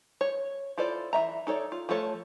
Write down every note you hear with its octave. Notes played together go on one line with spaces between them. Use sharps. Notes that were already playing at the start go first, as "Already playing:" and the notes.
C#5
E4 F4 A4 C5 D5
E3 F3 E5 A#5
D#4 A4 C#5 D5
F4
F3 A3 A4 C#5